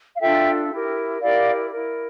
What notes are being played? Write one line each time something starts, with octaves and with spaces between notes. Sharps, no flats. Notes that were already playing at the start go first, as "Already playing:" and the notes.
F5
D4 F4 A4 E5 G5
E4 G4 A#4
E4 G4 A#4 D5 F5
E4 A#4